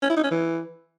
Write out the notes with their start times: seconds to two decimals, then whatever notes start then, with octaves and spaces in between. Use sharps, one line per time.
0.03 C#4
0.10 E4
0.17 D#4
0.24 C#4
0.31 E3